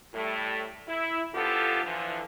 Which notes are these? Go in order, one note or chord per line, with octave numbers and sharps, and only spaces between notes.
A2 G3 A3
E4
D3 F3 B3 F4 G4 A4
D3 E3 F3